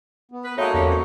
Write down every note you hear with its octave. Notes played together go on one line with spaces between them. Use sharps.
B3
B4
G#3 A#3 D#4 F#4 A4 C#5 E5
E2 D3 G3 C#4
F2